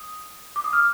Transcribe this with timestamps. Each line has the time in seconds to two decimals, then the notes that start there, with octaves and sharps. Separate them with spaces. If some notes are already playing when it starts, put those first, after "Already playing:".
Already playing: D#6
0.56 D6
0.64 D#6
0.73 F6